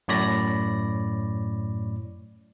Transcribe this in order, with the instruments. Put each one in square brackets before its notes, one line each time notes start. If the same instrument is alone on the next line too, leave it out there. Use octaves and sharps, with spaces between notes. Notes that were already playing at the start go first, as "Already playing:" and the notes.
[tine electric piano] F#2 A2 C#5 D5 B5 A#6